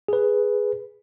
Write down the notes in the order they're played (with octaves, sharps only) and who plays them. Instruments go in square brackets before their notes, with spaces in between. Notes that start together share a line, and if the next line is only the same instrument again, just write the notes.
[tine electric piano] G#4 B4